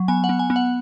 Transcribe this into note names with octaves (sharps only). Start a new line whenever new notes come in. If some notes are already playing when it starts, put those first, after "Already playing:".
Already playing: F#3
B3 G#5
F#5
B3
G#5
B3
F#5